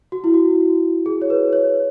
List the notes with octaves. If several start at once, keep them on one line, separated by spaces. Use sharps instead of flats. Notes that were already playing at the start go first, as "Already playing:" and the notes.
F#4
E4
F#4
G#4
C#5
B4
C#5